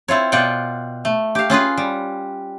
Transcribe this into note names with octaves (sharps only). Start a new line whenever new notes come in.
C4 E4 F4 C#5
B2 F4 D5 F#5 G5
A3
G4 F5
C#4 F4 G#4 B4
G3